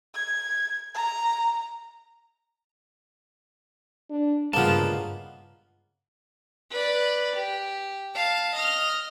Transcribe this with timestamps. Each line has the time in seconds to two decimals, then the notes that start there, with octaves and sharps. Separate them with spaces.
0.15 G#6
0.95 A#5
4.10 D4
4.53 G2 C#3 G#3 A#3 B3 F4 A5
6.71 B4 D5
7.36 G4
8.15 F5 A5
8.55 D#5 F6